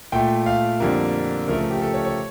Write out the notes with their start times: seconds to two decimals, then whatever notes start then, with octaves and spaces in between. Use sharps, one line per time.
0.12 A#2 A3 G5
0.46 F5
0.80 F2 D3 G3 A#3
1.48 C#3 F3 A3 A#4
1.59 A#4
1.71 G4
1.82 A4
1.94 C#5
2.05 C#5